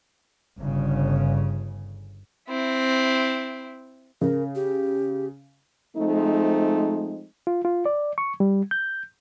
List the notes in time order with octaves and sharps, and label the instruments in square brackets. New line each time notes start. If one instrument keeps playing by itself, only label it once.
[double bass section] G1 C#3
[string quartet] C4 E4
[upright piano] C#3 [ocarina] A#4
[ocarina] G4
[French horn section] F3 G#3 A3 C4 D#4
[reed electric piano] F4
F4
D5
C#6
G3
G6